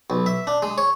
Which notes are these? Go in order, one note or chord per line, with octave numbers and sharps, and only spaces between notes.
B1
E5
D4
G#3
C#5